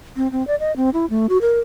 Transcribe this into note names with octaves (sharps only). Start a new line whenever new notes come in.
C4
C4
D5
D#5
C4
E4
A3
F#4
A#4